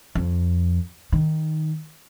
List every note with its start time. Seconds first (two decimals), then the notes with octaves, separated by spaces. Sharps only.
0.15 F2
1.12 D#3